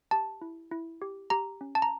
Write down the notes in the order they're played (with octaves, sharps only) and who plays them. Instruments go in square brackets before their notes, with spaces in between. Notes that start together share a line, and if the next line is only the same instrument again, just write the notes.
[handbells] G4 A5
E4
E4
G4
G4 A#5
C#4
A5
A#5